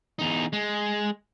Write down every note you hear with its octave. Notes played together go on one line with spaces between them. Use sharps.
E2 D#4
G#3